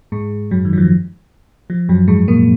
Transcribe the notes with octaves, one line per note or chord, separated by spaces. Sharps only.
G#2 G#3
F#2 F#3
D#3
F#3
F3
F3
F#2 F#3
G#2 G#3
A#2 A#3